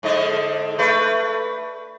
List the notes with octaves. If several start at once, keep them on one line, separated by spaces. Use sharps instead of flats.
G#2 D3 D#5
A3 B4